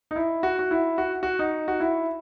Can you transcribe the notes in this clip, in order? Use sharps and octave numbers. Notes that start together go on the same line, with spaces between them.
D#4
E4
F#4
F#4
E4
F#4
F#4
D#4
F#4
E4